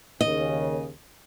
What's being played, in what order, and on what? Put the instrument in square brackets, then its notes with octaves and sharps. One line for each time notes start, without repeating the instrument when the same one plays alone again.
[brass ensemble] D#2 C#3 [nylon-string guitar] D#5